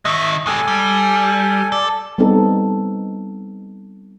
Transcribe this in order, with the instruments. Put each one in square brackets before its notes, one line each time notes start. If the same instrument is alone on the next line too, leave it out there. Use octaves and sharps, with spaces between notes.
[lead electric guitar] D#3 G#3 [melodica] D#5 E5 C#6
[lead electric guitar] G#3 G4 [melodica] A4 G#5
[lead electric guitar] G3
[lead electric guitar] A4 [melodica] D5
[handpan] G3 B3 C4 D#4 A4